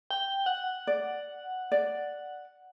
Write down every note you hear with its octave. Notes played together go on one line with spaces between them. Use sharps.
G5
F#5
D5
D5